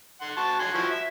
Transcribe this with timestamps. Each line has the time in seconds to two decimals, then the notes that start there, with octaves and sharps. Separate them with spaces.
0.21 F#5 C6
0.37 F#4 A5
0.60 F#5 G#5 C6
0.74 F3 E4 F#4
0.91 E5